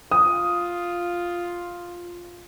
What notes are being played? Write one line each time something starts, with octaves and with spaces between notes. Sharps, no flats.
F4 D#6